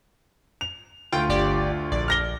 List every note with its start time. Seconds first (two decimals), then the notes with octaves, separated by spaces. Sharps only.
0.61 F7
1.12 D2 F4 G5
1.29 G1 G4 D5
1.92 A#1 D5
2.08 F6 A#6 G7